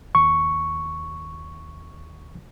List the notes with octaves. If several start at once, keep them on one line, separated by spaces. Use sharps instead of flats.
D#2 C#6